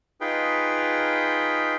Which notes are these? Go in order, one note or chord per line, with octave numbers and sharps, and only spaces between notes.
D#4 F4 G#4 B4 G5